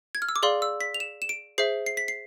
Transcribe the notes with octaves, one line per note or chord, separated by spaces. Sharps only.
G#6
F6
E6
D6
G#4 D5 F5 C6
E6
B6
F7
E7
E7
D7
G#4 C5 E5 C7
C7
B6
C7